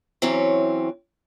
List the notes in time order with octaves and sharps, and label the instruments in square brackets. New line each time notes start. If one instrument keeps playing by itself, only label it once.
[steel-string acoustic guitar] E3 F#3 C4 C#4